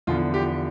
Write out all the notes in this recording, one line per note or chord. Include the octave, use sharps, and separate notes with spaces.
E2 D3 F3 F4
G4